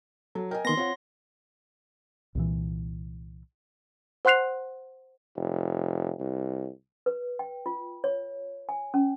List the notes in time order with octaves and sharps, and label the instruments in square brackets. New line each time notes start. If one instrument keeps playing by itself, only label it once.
[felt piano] F#3 [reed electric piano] A4
[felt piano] A#4 D#5 G#5 [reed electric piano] G5
[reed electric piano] D#3 A#3 B3 [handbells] C6 A#6
[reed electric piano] C4 F4 [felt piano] C#5 F#5
[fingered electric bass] C2 A#2 E3
[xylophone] C5 F#5 C6 F#6 C7 F7
[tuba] F1
C2
[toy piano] B4
G5
F4
C#5
G#5
C#4